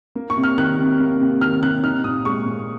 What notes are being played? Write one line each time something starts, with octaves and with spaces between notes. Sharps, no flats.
A#3
C#6
C3
F6
D#3 F#6
C3
A#3
C3
D#3 F6
C3 F#6
D#4 F6
A#2 D#6
G#3 C#6
A#2